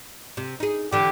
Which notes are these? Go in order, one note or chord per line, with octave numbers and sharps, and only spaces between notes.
C3
D#4 G#4
D3 E3 G4